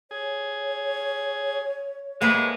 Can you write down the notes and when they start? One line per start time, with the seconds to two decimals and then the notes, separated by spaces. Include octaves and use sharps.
0.11 G#4 C#5
2.21 A2 C#3 G#3 A#3 B4